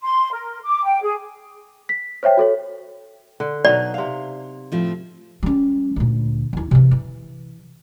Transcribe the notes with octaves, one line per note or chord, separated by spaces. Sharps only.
C6
A#4
D6
G5
G#4
B6
C5 C#5 E5 G5
F#4 A4 C#5
D3
B2 F#3 D#4 D5
C3 F5
A2 F3 C4
G3 C#4
D2 A#2
D#2 E4
C3 E3
E3